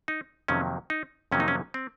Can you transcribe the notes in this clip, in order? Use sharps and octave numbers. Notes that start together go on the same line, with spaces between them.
D#4
F2 C3 D#3 F#3 A#3 C#4
D#4
F2 C3 D#3 F#3 A#3 C#4
D#4
C#4
C4